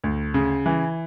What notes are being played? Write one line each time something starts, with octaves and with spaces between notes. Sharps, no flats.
D2
C#3
E3